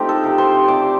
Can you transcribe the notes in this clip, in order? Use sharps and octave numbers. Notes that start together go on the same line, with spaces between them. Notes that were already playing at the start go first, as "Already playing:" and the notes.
Already playing: F3 A3 C4 D#4 F4 G4
A4
C3
C5
C3 D5